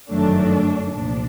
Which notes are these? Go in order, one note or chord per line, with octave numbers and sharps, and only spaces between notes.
G1 F#2 D#3 F#3 A3 D4
C2 A#2 F3 D4